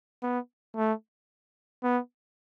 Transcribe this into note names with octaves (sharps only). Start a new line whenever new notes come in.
B3
A3
B3